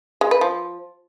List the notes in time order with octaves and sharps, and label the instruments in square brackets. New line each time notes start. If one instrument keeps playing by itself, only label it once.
[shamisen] G#3
B4
F3